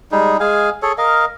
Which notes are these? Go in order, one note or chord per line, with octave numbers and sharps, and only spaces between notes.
G3 G#3 D#4 G#4
G#3 G#4 F5 G#5
G#4 A4 C#5
A#4 D#5 F5